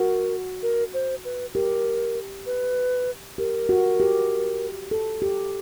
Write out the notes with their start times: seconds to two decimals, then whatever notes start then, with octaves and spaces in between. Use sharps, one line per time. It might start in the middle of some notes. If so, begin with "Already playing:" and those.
Already playing: F#4 A#4
0.63 A#4
0.94 C5
1.25 B4
1.54 G4 A#4
2.46 B4
3.38 G4 A#4
3.69 F#4
4.00 G4
4.91 A4
5.22 G4